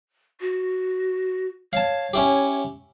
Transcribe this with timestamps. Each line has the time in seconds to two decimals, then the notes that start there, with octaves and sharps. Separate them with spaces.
0.40 F#4
1.73 C#5 F5 A5
2.14 C#4 E4 G4